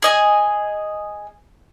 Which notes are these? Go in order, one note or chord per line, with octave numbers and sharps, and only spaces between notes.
G#4 D#5 G#5